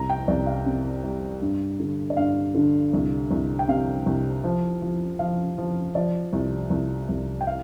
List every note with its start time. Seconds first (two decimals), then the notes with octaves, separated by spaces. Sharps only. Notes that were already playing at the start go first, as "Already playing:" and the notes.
Already playing: C2 A#5
0.09 G5
0.28 C2 D5
0.47 F5
0.66 C3
1.04 G3
1.42 G2
1.80 D3
2.10 D5
2.17 G2 F5
2.55 D3
2.93 C2
3.31 C2
3.59 G5
3.68 C3 F5
4.06 C2
4.44 F3
4.82 F3
5.19 F3 F5
5.58 F3
5.95 F3 D5
6.33 C2
6.70 C2
7.09 C2
7.41 G5
7.47 F5